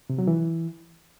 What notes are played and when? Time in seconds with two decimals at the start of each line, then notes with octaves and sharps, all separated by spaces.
0.10 C3
0.19 F#3
0.27 E3